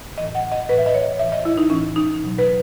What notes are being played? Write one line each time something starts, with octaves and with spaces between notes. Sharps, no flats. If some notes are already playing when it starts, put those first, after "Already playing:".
A2 E3 D#5
F#5
D#5
A2 E3 B4
E5
D#5
C#5
A2 E3 E5
D#5
E4
D#4
A2 E3 C#4
D#4
B2 F#3
B4